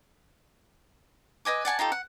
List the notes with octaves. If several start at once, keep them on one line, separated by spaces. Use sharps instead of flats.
B4 D#5 G#5 D6
D5 F#5 G#5 A5
D#4 F4 G4 A4
F#5